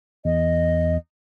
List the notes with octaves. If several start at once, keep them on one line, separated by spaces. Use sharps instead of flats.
E2 D#5